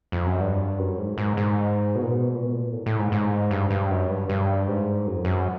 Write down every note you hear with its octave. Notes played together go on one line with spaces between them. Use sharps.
F2
F#2
G2
F#2
G#2
G#2
G#2
B2
A#2
B2
A#2
B2
A#2
A2
A2
G#2
G#2
G2
G2
F#2
G2
G2
G#2
F#2
F2
F#2